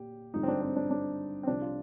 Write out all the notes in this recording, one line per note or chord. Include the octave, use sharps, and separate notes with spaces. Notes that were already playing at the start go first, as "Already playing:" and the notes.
Already playing: A#2 G4
G#1 G2 D3 F3 D#4
C4
D4
C4
D4
D4
C4
C2 C3 F3 D4
F4